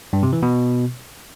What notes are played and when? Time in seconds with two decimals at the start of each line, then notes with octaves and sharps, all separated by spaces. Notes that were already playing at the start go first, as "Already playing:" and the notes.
0.13 G2
0.23 C3
0.33 E3
0.43 B2